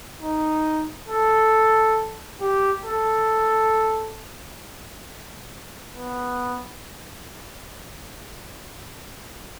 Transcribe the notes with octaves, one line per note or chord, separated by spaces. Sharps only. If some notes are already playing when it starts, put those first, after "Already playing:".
D#4
A4
G4
A4
B3